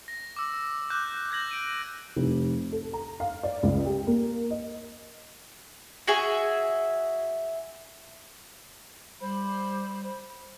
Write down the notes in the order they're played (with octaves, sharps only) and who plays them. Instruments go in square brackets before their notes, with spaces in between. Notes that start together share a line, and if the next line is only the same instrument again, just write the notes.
[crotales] A#6
D6 E6
D6 F#6 G6
G6 G#6 A#6 F#7
D7 D#7
[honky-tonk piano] F1
A4
A#5
F5
D5
C#2
G4
A#3
D#5
[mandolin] F#4 G#4 E5 G#5
[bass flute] G3 [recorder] C5 [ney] B5